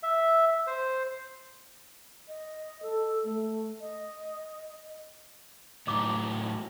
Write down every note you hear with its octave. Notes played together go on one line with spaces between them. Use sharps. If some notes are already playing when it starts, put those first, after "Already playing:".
E5
C5
D#5
A4
A3
D#5
A2 F#3 D#4 D#5 D6